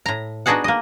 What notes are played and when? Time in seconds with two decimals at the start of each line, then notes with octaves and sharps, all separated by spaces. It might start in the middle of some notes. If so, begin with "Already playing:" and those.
0.06 A2 A#5
0.46 B3 D4 D#4 F#4 G#4 F#5
0.64 A#3 D#5